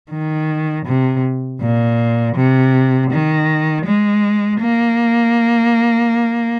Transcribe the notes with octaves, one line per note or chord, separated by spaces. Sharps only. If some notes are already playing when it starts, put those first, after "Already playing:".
D#3
C3
A#2
C3
D#3
G#3
A#3